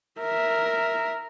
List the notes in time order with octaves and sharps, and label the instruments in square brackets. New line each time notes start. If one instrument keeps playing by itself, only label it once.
[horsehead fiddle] A#4 E5